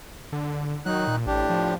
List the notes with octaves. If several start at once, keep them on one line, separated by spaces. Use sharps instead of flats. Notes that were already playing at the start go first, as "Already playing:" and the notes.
D3
D#3 F#3 D#4 F#6
A#2
A1 A2 D4 G4
F3